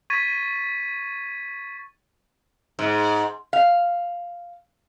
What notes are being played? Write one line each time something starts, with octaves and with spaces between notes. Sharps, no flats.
C#6 G#6 A6 B6 D#7
G#2
F5